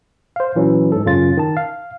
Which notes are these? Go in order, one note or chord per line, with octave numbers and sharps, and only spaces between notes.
C5 F5
A#2 E3 F#3 C#4
G#2 A4
F#2 C#3 C#4 F4 A6
D#3 A5
F5